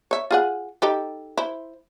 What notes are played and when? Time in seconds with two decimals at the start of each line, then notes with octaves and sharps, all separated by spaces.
0.11 C#5 E5
0.31 F4 G#4 F#5
0.82 D#4 G4 A4
1.37 E4 C5